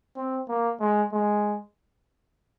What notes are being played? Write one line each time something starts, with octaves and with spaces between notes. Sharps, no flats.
C4
A#3
G#3
G#3